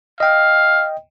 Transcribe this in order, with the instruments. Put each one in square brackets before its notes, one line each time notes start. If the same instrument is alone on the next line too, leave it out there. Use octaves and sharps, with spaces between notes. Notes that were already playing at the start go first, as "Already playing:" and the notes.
[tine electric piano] D#5 G5 [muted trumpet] F5